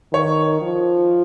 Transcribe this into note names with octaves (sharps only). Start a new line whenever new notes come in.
D#3 C#5
F3